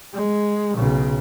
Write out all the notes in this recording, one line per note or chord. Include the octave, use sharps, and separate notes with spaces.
G#3
B1 C#3